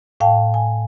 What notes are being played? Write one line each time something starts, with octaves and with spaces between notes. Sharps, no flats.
A2 F5 G5 A5
G#5